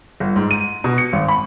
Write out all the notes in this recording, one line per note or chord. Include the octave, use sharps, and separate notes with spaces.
G1
G#2
D#7
B2
C#7
G#1
B5